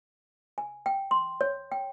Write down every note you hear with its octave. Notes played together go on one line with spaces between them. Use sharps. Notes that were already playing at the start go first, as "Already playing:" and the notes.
G#5
G5
C6
C#5
G5